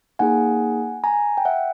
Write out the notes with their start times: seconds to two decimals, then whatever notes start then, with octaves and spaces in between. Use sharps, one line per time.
0.19 A#3 D#4 G#4 F#5 G#5
1.04 G#5 A#5
1.38 G5
1.45 E5 F#5